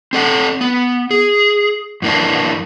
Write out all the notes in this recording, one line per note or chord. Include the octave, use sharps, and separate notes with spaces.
C4 A4 F#5
B3
G#4
F#2 E3 A#3 D4